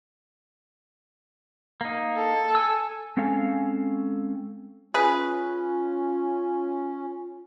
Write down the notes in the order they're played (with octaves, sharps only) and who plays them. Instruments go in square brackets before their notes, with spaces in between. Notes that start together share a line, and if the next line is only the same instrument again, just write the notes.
[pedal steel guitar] A#3 D#4
[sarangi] A4
[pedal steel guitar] G#5 E6
[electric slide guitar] G#3 C4 C#4 A4 F5 G#5
[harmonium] C#4 [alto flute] F4 [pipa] G#4 B4